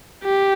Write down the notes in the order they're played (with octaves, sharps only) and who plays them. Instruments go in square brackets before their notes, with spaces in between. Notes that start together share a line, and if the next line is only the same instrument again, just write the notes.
[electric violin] G4